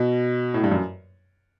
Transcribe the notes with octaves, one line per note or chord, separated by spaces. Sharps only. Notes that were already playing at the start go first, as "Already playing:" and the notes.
Already playing: B2
A2
G2
F#2